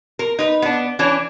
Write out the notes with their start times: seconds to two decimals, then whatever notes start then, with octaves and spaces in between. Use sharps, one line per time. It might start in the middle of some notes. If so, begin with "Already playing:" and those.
0.19 A#4
0.39 D#4 B4
0.62 B3 D4
0.99 E3 C#4 D4